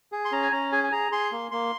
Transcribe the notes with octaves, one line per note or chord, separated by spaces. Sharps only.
G#4
C6
C#4 A#5
G#5
C#4 A#5
G#4 G#5
G#5
G#4 A#5
G#4 C6
A#3
A#3 C6